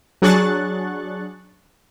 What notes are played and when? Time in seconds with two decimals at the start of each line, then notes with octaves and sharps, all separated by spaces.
0.22 F#3 D4 G#4 C#6 F#6 A6